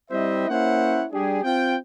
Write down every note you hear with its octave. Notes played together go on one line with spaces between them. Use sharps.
G3 C4 E4 C5 D#5 E5
A#3 C#4 E4 C5 C#5 F#5
G3 D4 G4 G#4
C4 F4 G5